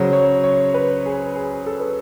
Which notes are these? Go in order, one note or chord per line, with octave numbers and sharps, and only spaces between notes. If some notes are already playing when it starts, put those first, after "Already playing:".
Already playing: C#3 F#3 C5
C#5
C#5
B4
G#4
G#4
A4
B4